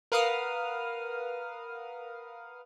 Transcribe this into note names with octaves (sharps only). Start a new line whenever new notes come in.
A#4 B4 F5 F#5 D#6 F6